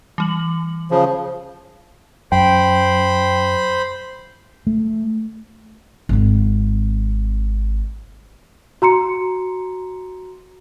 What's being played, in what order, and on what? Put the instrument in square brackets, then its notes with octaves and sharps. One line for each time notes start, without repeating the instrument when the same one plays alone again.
[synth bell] E3 G3 F#7
[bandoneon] C#3 F3
[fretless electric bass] F#2 [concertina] C5 B5 [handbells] G5
[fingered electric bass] A3
[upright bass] G#1 C4
[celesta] F#4 A#5 C6 C#7